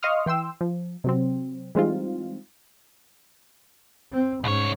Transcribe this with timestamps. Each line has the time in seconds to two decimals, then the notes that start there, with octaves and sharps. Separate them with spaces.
0.03 D#5 F5 C6 C#6 D#6 F6
0.26 E3 G5 C6 E6
0.61 F3
1.04 C3 F#3 C4
1.75 E3 G3 G#3 C4 D#4 F4
4.13 C4
4.44 C2 G#2 C#4 C#5